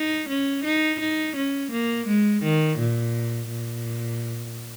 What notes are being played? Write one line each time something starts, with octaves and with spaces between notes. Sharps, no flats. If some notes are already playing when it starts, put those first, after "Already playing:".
Already playing: D#4
C#4
D#4
D#4
C#4
A#3
G#3
D#3
A#2
A#2